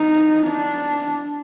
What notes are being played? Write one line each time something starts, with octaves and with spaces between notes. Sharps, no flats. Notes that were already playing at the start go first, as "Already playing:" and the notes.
Already playing: D#4
D4